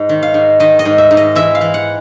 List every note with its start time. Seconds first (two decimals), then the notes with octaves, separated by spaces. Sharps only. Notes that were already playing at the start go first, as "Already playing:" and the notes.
Already playing: G#2
0.09 D#3
0.23 F5
0.34 G#2
0.60 D#3 D#5
0.79 D#5
0.85 G#2
0.98 E5
1.11 G#2
1.17 D#5
1.35 E3 E5
1.55 F5
1.61 E3
1.74 F#5